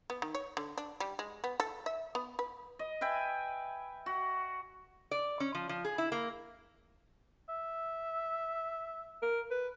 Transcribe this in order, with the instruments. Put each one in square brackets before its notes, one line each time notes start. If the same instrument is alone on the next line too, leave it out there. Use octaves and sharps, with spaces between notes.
[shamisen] B3
D#3
C#5
D3
D4
G3
G#3
B3
A4
E5
B3
B4
[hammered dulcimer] D#5
B4 E5 G5 G#5
F#4
[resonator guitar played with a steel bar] D5
C#4
F3
F3
G#4
E4
A#3
[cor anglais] E5
[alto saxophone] A#4
B4